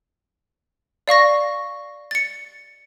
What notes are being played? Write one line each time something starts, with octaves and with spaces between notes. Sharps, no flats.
D5 F5 C#6 A#6
A6 C#7